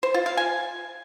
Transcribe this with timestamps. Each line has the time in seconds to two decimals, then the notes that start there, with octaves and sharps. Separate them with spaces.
0.03 C5
0.14 F4
0.26 F5
0.37 G#5